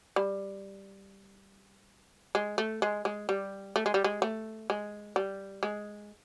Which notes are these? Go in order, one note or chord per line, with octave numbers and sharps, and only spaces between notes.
G3
G#3
A3
G#3
G#3
G3
A3
G#3
G3
G#3
A3
G#3
G3
G#3